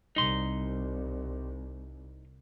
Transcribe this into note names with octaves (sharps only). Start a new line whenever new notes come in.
C2 D#4 C6